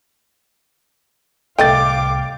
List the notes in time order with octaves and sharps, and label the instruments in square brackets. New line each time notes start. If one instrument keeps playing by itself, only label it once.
[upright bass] C2 A2 [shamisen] A3 D#5 [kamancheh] F5 D6 [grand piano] G5 A6